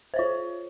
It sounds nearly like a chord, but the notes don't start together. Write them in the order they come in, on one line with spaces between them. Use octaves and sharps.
C5 C#5 F4